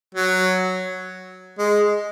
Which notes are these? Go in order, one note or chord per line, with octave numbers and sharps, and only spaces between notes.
F#3
G#3